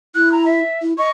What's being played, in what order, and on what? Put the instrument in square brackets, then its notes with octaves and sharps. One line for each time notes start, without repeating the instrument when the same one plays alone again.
[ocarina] E4 [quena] F#6
[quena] A#5
E5
[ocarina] E4
[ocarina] D#5 [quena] C#6